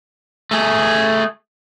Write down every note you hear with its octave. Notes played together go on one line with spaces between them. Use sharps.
A3 G#4